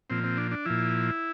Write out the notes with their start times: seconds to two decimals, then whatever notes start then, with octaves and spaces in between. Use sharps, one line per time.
0.10 A#2 F3 C4
0.24 C4
0.37 D4
0.51 D4
0.65 A#2 F3 E4